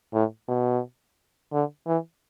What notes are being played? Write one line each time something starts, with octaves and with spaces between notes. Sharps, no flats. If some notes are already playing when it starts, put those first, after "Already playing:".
A2
B2
D3
E3